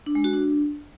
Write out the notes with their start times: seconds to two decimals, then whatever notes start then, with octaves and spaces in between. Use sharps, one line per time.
0.06 D4
0.15 G#3
0.24 F#4
0.33 D4